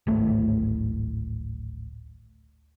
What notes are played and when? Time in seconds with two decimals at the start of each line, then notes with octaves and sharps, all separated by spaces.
0.07 D1 G#1 A2 A3